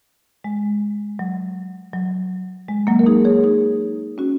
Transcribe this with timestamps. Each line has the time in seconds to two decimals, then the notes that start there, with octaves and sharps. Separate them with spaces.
0.44 G#3
1.19 F#3
1.93 F#3
2.68 G#3
2.87 F#3 A#3
2.99 A#4
3.06 D#4 G#4
3.25 G#4 C#5
3.44 D#4 G#4
4.18 C#4 F#4